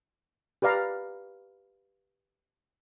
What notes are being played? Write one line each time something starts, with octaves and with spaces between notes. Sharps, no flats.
G4 B4 D5 F5 A#5